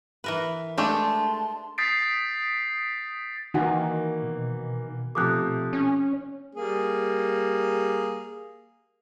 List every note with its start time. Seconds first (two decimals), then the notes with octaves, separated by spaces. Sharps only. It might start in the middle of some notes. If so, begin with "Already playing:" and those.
0.24 E3 A#4 B4
0.78 G#3 A3 D4 G4 A5 C6
1.78 D#6 G6 A6 B6 C7 D7
3.54 D#3 E3 A#3 D#4 F#4 F#5
4.22 B2
5.15 C3 F3 A3 D6 D#6 F#6
5.73 C#4
6.55 G3 A#3 G#4